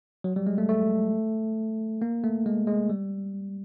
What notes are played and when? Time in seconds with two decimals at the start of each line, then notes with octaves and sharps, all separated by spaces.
0.24 F#3
0.36 G3
0.47 G#3
0.58 A3
0.69 A3
2.02 A#3
2.24 A3
2.46 G#3
2.67 G#3
2.90 G3